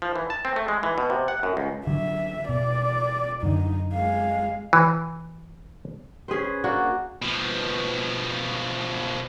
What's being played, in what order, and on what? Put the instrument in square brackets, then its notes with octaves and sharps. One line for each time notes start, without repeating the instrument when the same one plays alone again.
[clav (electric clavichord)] F3
E3
A5
C4
A3
G#3
E3
B2
C3
F#5
F#2
C#2
[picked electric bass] D3 F#3 [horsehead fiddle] E5
[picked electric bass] B2 [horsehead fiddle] D5
[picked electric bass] F#2 D3 [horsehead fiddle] D#4
[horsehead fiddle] G#3 F5
[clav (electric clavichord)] E3
[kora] C#4 G#4 B4 C5
A#3 D4 F#4
[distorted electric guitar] B2 F3